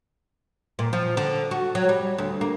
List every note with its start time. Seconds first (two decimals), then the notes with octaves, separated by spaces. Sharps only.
0.79 A#2
0.93 F3
1.17 D3
1.51 F#4
1.75 F#3
1.89 G3
2.18 D2
2.41 A#3